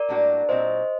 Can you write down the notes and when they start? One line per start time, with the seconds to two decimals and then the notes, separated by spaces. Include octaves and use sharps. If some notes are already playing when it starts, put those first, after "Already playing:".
Already playing: A#4 D5
0.09 A2 G3 A#3 D4 F#4
0.49 A#2 F#3 C4 C5 D#5